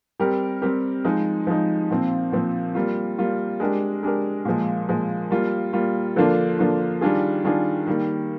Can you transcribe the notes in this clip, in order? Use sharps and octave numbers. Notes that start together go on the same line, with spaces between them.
G3 C4 G4 A#4
G3 C4 G4 A#4
F3 G#3 D#4
F3 G#3 D#4
A#2 F3 C4
A#2 F3 C4
G3 A#3 F4
G3 A#3 F4
G#3 D4 G4 A#4
G#3 D4 G4 A#4
A#2 F3 G#3
A#2 F3 G#3
G3 A#3 F4
G3 A#3 F4
D3 F3 A#3 D4 F4
D3 F3 A#3 D4 F4
D#3 G3 D4 F4 G#4
D#3 G3 D4 F4 G#4
D#3 G3 A#3